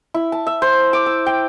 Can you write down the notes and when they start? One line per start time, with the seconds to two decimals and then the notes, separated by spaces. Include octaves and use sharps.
0.14 E4
0.32 A5
0.47 E5
0.62 C5
0.93 D6
1.06 E6
1.26 G5